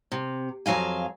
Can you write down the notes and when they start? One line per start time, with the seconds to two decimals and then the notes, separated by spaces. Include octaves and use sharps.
0.12 C3
0.66 F2 F#3 F5 G#5